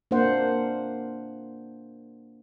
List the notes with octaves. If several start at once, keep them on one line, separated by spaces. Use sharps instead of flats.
A#3 D4 C5 F#5